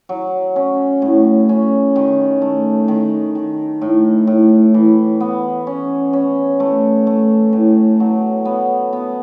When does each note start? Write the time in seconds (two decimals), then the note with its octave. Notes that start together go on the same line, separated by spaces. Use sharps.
0.09 F#3
0.56 C#4
1.02 A2
1.49 C#4
1.96 D#3
2.42 A3
2.88 D#3
3.35 D#3
3.81 A2
4.27 A2
4.74 E3
5.20 B3
5.67 C#4
6.13 C#4
6.60 A3
7.07 A3
7.53 A2
8.00 F#3
8.45 B3
8.93 B3